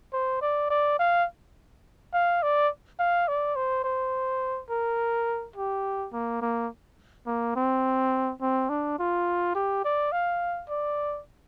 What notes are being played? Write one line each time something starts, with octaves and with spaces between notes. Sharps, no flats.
C5
D5
D5
F5
F5
D5
F5
D5
C5
C5
A#4
G4
A#3
A#3
A#3
C4
C4
D4
F4
G4
D5
F5
D5